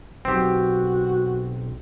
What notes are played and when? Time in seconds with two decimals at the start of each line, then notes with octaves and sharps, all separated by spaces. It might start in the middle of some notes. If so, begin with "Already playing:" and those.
0.25 B1 C4 F#4 G4